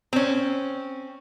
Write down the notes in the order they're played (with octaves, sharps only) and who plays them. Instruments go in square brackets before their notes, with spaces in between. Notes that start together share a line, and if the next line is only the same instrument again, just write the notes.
[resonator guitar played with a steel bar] C4 C#4